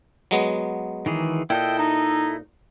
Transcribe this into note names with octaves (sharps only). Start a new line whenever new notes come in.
F#3 G#3 B3
D#3 E3 G#4
A#2 E4 A4 D#5 G5
D#4